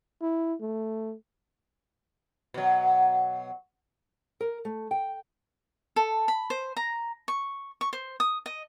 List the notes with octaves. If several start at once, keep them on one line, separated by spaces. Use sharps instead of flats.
E4
A3
B2 F#3
A#4
A3
G5
A4
B5
C5
A#5
C#6
C#6
C5
D#6
D#5